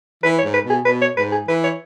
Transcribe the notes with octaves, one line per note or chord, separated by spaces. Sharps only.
E3 B4
C#5
G#2
B4
B2 G#4
B2 B4
C#5
G#2 B4
G#4
E3 B4
C#5